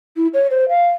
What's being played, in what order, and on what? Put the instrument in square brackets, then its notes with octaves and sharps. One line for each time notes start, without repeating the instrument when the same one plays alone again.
[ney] E4
C#5
C5
F5